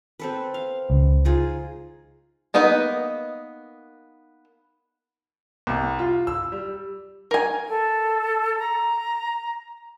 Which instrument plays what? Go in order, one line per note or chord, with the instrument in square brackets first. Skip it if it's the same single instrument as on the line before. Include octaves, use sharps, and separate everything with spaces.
[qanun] C4 A4 B4
F5
[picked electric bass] C#2
[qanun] D#4 F4 G#4
[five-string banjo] A#3 B3 D#4 B4 D#5
[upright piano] C2
F4
E6
G3
[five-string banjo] A#4 G#5
[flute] A4
A#5